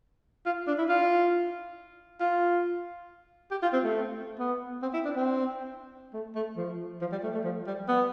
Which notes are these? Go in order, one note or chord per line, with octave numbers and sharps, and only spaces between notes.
F4
D4
E4
F4
F4
G4
F4
C4
A3
B3
C4
E4
D4
C4
A3
A3
F3
F3
G3
A3
A3
F3
G3
B3